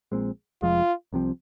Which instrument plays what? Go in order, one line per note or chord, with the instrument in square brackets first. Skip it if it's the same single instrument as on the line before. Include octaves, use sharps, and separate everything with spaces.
[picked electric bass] A#1 A#2 G#3 C4
[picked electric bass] F1 F2 F3 G#3 [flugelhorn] F4
[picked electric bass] C2 C3 F3 C4